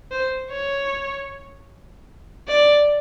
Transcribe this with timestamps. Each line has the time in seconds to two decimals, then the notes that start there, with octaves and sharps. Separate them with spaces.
0.11 C5
0.51 C#5
2.48 D5